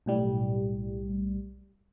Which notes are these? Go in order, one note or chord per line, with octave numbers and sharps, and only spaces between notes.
B1 A2 G3